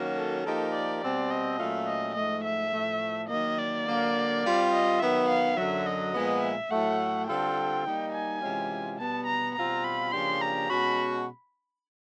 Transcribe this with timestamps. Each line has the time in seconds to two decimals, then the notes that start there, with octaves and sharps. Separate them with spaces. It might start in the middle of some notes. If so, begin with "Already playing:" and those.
Already playing: D#3 F#3 A#3 C#4 F#4
0.17 A4
0.45 F3 A#3 D#4 G4 A4 A#4
0.73 D5
1.02 B2 G3 C4 D5
1.31 D#5
1.59 A#2 F#3 A3 C#4 F4
1.87 D#5
2.15 G#2 F3 A3 D#5
2.45 E5
2.72 A2 F3 A3
3.29 D#3 F#3 A#3 D#5
3.58 D5
3.86 D3 F#3 A#3
4.44 G3 C4 F4
4.72 D#5
5.00 D#3 F#3 B3 E5
5.29 F5
5.57 F#2 D3 F#3 E5
5.86 D#5
6.14 A#2 F3 G#3 B3
6.42 E5
6.71 A2 F#3 A3 F#5
7.28 D3 G3 C4 F4 A4 G5
7.85 G3 A#3 D#4
8.13 G#5
8.42 C3 E3 G#3 C#4 F4
8.98 B2 G3 B3 A5
9.27 A#5
9.56 B2 G3 C4 F4 A#5
9.84 B5
10.12 C#3 F3 A#3 D4 G4 C6
10.41 A#5
10.69 B2 G#3 C#4 F#4 B5